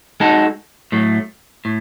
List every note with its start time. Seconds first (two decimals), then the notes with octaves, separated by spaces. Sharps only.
0.20 G#3 D#4 F#4 A4
0.92 A2 F#3 A3
1.65 A2